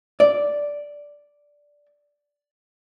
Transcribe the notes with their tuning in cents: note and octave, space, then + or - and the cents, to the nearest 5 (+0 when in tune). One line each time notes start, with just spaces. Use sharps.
D5 -5